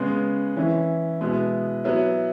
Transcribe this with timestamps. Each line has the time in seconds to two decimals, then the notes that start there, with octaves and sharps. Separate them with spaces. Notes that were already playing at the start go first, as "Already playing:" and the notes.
Already playing: C#3 G#3 B3
0.56 E3 C#4 E4
1.21 B2 G#3 B3 E4
1.84 F#3 B3 E4